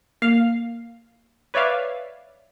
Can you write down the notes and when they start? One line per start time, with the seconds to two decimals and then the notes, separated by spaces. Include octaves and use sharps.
0.22 A#3 F5
1.54 B4 C#5 D5 E5 F5